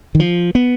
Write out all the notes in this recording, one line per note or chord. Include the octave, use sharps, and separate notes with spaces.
D#3
F3
B3